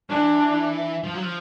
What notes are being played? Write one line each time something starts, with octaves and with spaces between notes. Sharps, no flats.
E3 D4
F3
F#3
F3